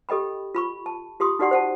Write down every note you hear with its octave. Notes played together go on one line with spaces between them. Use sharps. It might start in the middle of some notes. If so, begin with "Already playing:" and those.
G4 A4 D#5 G5 B5
F4 B5 C#6
A5
F4 G4 C6 D#6
D#4 F#4 G4 D5 F#5 C6
C5 F#5 A5